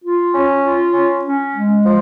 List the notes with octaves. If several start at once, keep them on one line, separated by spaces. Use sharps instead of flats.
F4
C#4
F4
C#4
C#4
G#3
F3